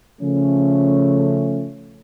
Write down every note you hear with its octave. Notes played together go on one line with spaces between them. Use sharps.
C#3 F3 A3 C#4